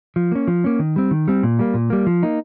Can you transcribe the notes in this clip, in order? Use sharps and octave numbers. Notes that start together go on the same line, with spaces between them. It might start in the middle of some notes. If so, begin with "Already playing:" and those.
F3
A#3 C#4
F3
A#3 C#4
D#3
G3 C4
D#3
G3 C4
A#2
G3 A#3
A#2
G3 A#3
F3
A#3 D#4